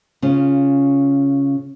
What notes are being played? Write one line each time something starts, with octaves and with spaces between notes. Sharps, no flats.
C#3 C#4 F4